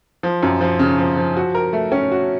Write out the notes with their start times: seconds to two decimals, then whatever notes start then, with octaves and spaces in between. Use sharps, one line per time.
0.23 F3
0.43 F#2
0.61 F3
0.79 C#3
0.99 F3
1.17 F3
1.36 F#4
1.55 A#4
1.73 A3
1.92 C#4
2.11 F#4